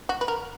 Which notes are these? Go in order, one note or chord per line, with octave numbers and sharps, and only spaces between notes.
F#4
B4
A#4